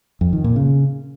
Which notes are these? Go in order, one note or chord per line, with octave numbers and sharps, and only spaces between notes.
F2
D#3
A#2
C#3